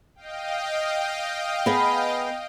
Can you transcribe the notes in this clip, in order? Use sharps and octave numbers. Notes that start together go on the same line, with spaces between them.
D#5 F5 G5
B3 G#4